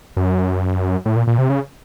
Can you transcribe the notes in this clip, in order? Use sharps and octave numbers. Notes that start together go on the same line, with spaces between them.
F#2
A2
A#2
A#2
C3
C#3